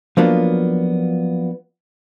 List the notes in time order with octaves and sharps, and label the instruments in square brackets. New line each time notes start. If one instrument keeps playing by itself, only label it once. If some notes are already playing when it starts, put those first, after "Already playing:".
[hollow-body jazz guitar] F3 F#3 A#3 B3 D4 F4